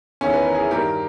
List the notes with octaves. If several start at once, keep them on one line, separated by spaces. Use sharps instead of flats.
E2 D#3 C#4 E4
B4
A#4
E4 G#4
G2 D#3 G4 A#4